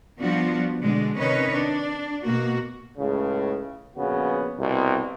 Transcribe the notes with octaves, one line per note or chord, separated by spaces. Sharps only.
F3 G3 B3 D4 F4 F#4
B2 D3 G#3 D4
C3 D#3 C#4 B4 C#5 D#5
D4
B2 A#3 F#4
C#2 A2 C#3
A#1 C#3 B3 F#4
C2 B2